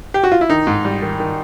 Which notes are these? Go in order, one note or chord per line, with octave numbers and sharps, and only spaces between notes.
G4
F#4
F4
E4
D#3 D#4
G#2
G3
D#3
D#3